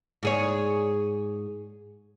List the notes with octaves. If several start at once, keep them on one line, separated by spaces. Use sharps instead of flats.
G#2 G#4 C#5